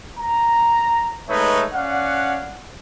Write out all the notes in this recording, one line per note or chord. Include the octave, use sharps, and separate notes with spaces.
A#5
G#3 A3 D#4 B4 C#5 E5
C#4 D5 F5 F#5